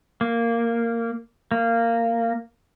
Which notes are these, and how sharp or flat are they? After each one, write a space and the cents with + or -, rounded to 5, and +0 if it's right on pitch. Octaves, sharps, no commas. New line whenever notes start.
A#3 -10
A#3 -15